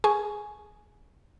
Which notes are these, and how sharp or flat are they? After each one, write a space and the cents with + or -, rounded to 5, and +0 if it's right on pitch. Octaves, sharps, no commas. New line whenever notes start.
G#4 +0 G#5 +10 C#6 +0